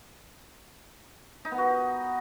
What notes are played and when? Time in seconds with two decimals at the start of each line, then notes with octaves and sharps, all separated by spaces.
1.45 D#4
1.51 B3
1.58 F#4